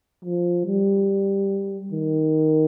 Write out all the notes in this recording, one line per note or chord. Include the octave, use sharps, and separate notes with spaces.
F3
G3
D#3